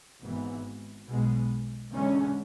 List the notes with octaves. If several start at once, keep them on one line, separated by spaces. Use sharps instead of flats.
G#1 G#2 E3 B3
B1 B2 G#3 B3
E2 D3 G#3 C#4